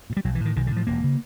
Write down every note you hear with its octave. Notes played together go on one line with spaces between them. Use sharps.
A#2
G3
B1 F#3
E3
A2 D#3
B1 D#3
D3
A2
F3
E1 A#3
C#3